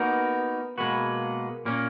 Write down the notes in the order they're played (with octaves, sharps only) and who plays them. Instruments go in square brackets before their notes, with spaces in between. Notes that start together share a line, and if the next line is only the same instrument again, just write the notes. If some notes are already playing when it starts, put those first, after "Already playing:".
Already playing: [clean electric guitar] A#3 D#4 F#4 A#4 [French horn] B3
[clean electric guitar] B2 G#3 B3 F#4 [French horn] A#3
[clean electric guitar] A#2 A#3 C#4